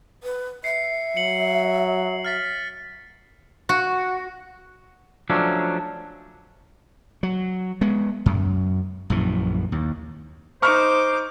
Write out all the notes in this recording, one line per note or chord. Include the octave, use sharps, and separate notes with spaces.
B4
E5 C7 C#7
F#3 C#7 F#7
F6 A6 B6
F#4
F3 F#3 A3 C#4 D4
F#3
G#3 B3
F#2
A#1 F#2 E3
D#2
D#4 C5 C#6 D6 F6